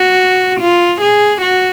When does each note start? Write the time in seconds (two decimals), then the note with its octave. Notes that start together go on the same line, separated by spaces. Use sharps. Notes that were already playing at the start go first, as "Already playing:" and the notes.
Already playing: F#4
0.60 F4
1.02 G#4
1.42 F#4